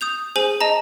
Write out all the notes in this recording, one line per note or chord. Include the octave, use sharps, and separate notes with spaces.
D#6 G6 F7
G#4 C5 G#5 F#7
D#5 A5 A#5